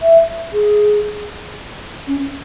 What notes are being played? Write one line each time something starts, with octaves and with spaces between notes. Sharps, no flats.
E5
G#4
C#4